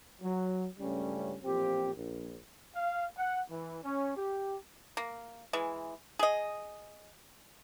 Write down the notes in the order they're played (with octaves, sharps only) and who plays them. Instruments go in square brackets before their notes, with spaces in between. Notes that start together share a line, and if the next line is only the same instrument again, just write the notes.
[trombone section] F#3
C#2 G2 C#3 G3 A3 C#4
A1 A#2 F3 C4 G4
A#1
[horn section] F5
F#5
E3
C#4
G4
[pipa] A#3
E3 G#3
G#4 D#5